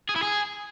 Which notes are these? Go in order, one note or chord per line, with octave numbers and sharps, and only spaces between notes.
G#4
E4
G#4